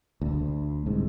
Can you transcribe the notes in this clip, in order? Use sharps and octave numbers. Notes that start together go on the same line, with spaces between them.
D2
C2 G#2